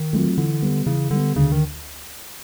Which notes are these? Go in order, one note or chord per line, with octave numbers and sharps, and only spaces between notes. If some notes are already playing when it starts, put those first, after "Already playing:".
Already playing: D#3
F#3 A3 C4 F4
D3 E3
G3 B3
C#3 E3
D3 G3 B3
D2 C#3
D#3